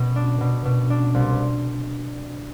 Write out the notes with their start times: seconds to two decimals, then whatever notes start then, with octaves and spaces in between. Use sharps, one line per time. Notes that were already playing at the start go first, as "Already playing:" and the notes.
Already playing: B2
0.16 D4
0.41 B2
0.65 B2
0.90 D4
1.14 C2